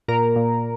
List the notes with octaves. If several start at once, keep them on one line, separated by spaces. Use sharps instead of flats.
A#2 A#4
A#2